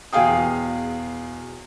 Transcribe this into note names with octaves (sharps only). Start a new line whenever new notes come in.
E2 B2 G#4 F5 G5 D#6